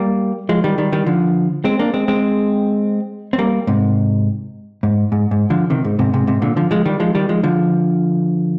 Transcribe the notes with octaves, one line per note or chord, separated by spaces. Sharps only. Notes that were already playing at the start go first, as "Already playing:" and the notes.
Already playing: G3 A#3
F3 G#3
D#3 G3
D#3 G3
D#3 G3
D3 F3
G#3 C4
A#3 D4
G#3 C4
G#3 C4
C4
G3 A#3
G#2 C3
G#2
G#2
G#2
D3 F3
C3 D#3
G#2
G#2 C3
G#2 C3
G#2 C3
A#2 D3
D3 F3
F3 G#3
D#3 G3
F3 G#3
D#3 G3
F3 G#3
D3 F3